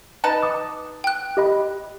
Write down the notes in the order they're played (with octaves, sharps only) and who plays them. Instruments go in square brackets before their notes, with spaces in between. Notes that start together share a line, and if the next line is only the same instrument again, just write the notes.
[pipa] D#4 B4 A5
[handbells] D6 D#6
[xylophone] G5 F#6
[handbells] G4 D#5 B5